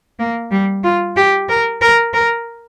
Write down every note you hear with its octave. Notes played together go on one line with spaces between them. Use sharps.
A#3
G3
F4
G4
A#4
A#4
A#4